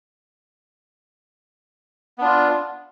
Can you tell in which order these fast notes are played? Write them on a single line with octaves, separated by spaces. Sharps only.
B3 D4 F4